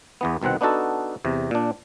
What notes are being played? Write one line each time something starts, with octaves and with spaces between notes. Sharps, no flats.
E2 E3 B3
C2 B2 D#3 C4 F#5
B3 D4 D#4 F#4 A4
E2 C3
A#2 D4